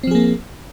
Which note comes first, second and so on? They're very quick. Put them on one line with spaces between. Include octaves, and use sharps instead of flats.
C4 F3 G#4 A#3